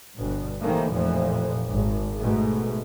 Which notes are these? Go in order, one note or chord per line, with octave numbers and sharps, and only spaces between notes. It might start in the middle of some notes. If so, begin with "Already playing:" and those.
G1 B2
C3 D#3 E3 A3 A#3
F1 F2 A#2 E3 F3
G#1
G#2 B2 A3